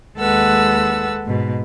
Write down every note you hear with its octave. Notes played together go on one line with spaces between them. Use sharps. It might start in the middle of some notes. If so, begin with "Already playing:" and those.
D#2 G#3 A4 B4 F#5 E6
G#2 B2